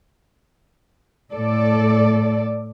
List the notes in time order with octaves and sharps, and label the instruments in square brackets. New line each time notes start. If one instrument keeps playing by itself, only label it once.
[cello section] A2 A4 D5